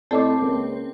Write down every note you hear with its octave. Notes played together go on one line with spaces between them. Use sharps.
A2 C4 A4 D5 D#5 A5 D6
C#2 A#3